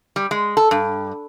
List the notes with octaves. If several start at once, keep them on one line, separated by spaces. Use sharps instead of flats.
G3
G#3
A4
G2